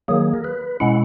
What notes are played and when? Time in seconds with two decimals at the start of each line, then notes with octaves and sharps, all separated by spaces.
0.08 D#3 F#3 A#3 G#4
0.34 A#4
0.44 B4
0.80 B2 G#3 C#4 E4 F#5